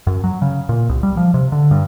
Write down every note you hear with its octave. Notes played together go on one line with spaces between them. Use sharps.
F#2
F#3
C#3
A#2
C2
G3
F3
C3
D3
G2